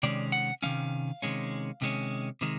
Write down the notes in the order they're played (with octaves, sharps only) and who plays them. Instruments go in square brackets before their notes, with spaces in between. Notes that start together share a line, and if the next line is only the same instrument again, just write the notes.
[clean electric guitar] C3 D#3 G#3 C#4 D5
F#5
C3 D#3 G#3 C#4 F5
C3 D#3 G#3 C#4
C3 D#3 G#3 C#4
C3 D#3 G#3